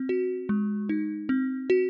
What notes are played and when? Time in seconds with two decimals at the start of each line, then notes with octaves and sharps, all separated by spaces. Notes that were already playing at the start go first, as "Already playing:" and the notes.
Already playing: C4
0.09 F#4
0.49 G#3
0.89 D#4
1.29 C4
1.70 F#4